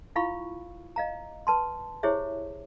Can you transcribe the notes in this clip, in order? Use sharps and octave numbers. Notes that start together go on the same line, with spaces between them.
E4 F4 F5 B5 C#6
D#5 F5 A#5
B4 A5 C6
E4 G4 G#4 C5 C#5 E5